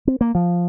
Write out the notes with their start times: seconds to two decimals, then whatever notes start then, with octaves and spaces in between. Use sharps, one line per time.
0.07 C4
0.21 A#3
0.35 F3